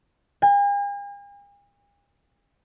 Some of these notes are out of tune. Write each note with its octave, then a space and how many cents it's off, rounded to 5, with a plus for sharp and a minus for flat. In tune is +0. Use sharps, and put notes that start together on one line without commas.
G#5 -45